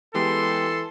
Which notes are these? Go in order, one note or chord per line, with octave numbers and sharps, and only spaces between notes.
E3 G#3 B3 G4 A4 C6